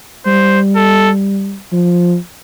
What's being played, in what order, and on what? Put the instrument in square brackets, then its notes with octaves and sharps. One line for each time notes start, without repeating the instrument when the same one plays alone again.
[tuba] G3 [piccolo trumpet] C5
[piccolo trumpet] A4
[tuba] F3